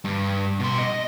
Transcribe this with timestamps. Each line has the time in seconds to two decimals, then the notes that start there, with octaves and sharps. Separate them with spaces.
0.04 G2
0.60 B2 C6
0.78 D#5